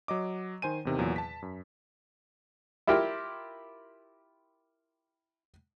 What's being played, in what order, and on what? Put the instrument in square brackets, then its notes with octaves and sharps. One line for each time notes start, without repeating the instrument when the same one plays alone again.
[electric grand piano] F#3 D#5 D6
D#3 C5 G#5 D#7
E2 C3 D#3
E2 A#2 F#3
A5 B6
F#2
[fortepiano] E4 F4 G4 A#4 G5